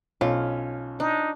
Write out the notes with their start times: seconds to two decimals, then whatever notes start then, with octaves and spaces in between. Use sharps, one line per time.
0.21 B1 C#4 F4
1.00 D4 D#4